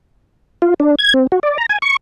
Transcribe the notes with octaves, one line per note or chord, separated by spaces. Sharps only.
F4
D4
G#6
C4
F#4
D5
A#5
G#5
C#6